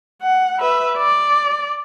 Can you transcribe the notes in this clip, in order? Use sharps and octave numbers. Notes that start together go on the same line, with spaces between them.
F#5
B4 E5
D5